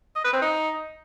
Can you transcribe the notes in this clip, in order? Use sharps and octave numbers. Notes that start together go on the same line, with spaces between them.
D#5
B4
C4
D#4